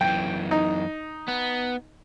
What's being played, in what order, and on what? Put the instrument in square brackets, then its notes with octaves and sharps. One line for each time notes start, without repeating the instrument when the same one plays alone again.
[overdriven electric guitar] F#2 E3 [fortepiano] G5
[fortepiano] D#4
[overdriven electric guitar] B3